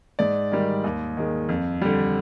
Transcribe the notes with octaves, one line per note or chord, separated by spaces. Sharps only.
G#2 D5
D#3 G3
D#2
D#3 G#3
F2
D3 G3